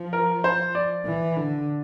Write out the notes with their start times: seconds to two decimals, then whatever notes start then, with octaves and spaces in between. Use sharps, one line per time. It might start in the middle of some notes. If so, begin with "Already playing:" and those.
Already playing: F3
0.13 A#4
0.44 C5
0.75 D5
1.06 E3
1.37 D3